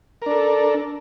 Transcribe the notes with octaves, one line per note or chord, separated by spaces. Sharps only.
D4 A4 A#4